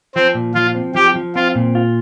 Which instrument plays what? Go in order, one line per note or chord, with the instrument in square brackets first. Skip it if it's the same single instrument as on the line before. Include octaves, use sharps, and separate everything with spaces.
[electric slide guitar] F3 [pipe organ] C4
[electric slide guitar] A#2
[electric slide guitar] F3 [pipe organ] F4
[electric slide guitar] C4
[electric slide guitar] F3 [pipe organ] G4
[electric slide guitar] F3
[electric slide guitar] C4 [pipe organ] F4
[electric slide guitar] A#2
F4